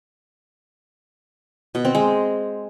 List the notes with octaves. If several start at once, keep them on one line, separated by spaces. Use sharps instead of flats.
B2
C4
G#3